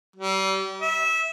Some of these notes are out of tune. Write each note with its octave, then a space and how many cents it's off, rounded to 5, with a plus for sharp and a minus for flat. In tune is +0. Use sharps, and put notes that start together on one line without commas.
G3 -35
E5 -20